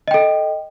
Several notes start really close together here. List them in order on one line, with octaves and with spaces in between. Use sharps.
D#5 G5 A4